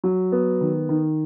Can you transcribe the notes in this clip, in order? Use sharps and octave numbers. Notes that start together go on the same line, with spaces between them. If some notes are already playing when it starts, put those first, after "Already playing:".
F#3
B3
D#3
D#3